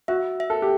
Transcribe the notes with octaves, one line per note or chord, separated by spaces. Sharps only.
F#4 E5
E5
A4
G4